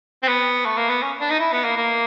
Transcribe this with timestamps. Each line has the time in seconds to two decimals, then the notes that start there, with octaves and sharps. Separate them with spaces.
0.23 C4
0.28 B3
0.66 A3
0.78 A#3
0.90 B3
1.02 C#4
1.21 D4
1.30 D#4
1.40 E4
1.52 B3
1.65 A#3
1.77 A#3